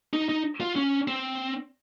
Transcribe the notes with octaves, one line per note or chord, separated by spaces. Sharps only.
D#4
D#4
F4
C#4
C4